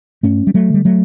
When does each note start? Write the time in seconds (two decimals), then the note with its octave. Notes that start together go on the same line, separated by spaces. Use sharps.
0.23 G2 A3 C#4
0.47 G3
0.54 F#3 A3
0.70 D3 G3
0.85 F#3 A3